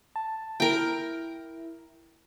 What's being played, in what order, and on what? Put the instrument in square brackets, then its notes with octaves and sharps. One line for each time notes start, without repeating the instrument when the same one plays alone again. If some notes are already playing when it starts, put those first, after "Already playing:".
[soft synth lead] A5
[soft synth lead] E4 [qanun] A#4 G5